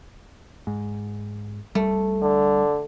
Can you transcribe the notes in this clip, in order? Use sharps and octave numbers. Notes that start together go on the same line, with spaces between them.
G#2
C2 G3 A3
D3